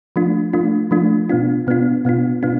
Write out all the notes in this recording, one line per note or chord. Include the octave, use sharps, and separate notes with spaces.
F3 A3 D4 F4
F3 A3 D4 F4
F3 A3 D4 F4
B2 B3 D4 F4
B2 B3 D4 F4
B2 B3 D4 F4
B2 B3 D4 F4